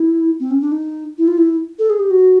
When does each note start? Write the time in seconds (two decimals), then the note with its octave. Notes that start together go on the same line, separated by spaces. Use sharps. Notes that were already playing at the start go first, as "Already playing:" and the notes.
Already playing: E4
0.40 C4
0.51 C#4
0.61 D4
0.72 D#4
1.18 E4
1.28 F4
1.38 E4
1.79 A4
1.90 G#4
1.99 G4
2.10 F#4